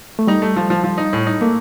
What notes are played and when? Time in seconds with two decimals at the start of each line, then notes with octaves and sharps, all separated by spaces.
0.19 A3
0.27 G3 D#4
0.42 A3
0.56 F3
0.70 F3
0.84 F3
0.98 D#4
1.13 A2
1.27 D#4
1.41 A3 A#3